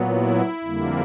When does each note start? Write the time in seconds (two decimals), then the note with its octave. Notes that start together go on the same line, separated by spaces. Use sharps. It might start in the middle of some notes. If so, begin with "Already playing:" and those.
Already playing: A#2 F#3 B3
0.09 E4
0.64 F2 D3 G3 A#3